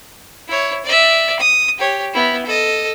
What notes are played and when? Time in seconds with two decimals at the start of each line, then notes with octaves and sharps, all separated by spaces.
0.48 E4 C#5
0.85 D5 E5
1.40 D#6
1.78 G4 C#5
2.14 B3 E4
2.46 A4 D#5